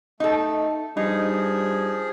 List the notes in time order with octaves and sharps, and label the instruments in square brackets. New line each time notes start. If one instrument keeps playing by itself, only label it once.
[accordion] A3 [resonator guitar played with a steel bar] D#4 A4
[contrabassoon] G2 [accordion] F3 G#4 [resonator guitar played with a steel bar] D#4